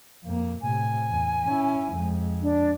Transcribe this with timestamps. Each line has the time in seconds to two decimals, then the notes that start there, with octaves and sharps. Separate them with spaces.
0.24 F2 A#3
0.62 A2 C3 G#5
1.11 E2
1.46 C#4 E4
1.94 F2 G#3
2.42 D4